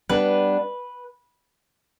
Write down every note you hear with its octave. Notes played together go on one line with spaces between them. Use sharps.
G3 B3 D4 B4